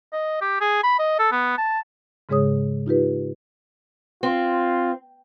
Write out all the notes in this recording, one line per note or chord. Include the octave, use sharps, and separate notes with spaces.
D#5
G4
G#4
B5
D#5
A4
B3
A5
G#2 C#3 G#3 G#4 C#5 D#6
D#4 F4 G4 B4
C4 F4